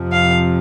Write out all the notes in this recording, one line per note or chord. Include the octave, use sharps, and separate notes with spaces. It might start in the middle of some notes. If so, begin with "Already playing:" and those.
Already playing: F2 C3 F3
F5